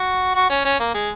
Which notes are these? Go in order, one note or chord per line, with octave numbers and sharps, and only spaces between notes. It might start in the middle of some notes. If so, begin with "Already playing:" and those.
Already playing: F#4
F#4
C#4
C#4
A#3
G#3